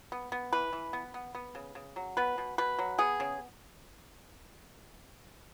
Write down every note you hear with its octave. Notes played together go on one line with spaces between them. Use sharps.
B3
B3
E3 B4
E3
B3
B3
B3
C#3
C#3
F#3
B3 B4
B2
B2 B4
F#3
B3 G#4
C#3